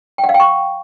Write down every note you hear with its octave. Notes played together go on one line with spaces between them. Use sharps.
G5
F#5
F5
G5
C#6